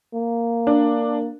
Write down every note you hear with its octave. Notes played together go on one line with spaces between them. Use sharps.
A#3
D4